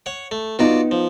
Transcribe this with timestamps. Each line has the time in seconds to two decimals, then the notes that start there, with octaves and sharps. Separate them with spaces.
0.06 C#5 F#5
0.31 A3
0.59 B3 D#4 F4 F#4 D5
0.91 F3